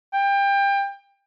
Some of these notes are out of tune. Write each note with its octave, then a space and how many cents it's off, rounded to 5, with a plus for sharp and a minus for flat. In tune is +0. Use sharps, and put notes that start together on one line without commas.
G5 +25